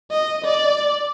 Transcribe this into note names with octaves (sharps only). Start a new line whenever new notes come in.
D#5
D5